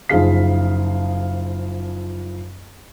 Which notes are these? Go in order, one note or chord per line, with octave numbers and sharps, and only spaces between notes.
F#1 F3 D#4 G#4 F5 B6